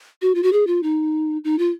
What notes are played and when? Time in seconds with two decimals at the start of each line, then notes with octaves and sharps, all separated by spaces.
0.22 F#4
0.35 F4
0.43 F#4
0.53 G#4
0.67 F4
0.83 D#4
1.44 D#4
1.59 F4